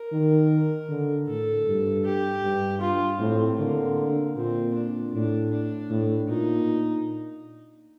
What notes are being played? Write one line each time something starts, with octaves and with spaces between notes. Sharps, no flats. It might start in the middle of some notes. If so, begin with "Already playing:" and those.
Already playing: A#4
D#3
D3
A2 A4
G2
G4
G2
F4
A2 C4
D3 A#3
A#2 C4
D4
A2 D4
D4
A2
A#2 D#4